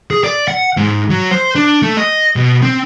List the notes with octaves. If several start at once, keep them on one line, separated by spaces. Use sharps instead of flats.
G#4
D5
F#5
G#2
F#3
C5
D4
A3
D#5
B2
C4